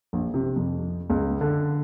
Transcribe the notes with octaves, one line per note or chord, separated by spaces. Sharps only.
A#1
C3
F2
C#2
D3